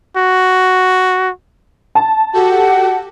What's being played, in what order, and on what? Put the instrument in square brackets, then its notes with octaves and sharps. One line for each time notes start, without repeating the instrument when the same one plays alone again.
[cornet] F#4
[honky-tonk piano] A5
[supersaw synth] F#4 G4 A4 [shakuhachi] F#5